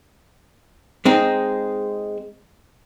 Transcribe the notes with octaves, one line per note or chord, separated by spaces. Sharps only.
G#3 C4 D#4